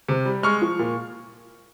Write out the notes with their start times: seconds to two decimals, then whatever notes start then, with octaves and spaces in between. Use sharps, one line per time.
0.09 C3
0.25 G3
0.43 G#3 C#6 F6
0.62 F3
0.79 A#2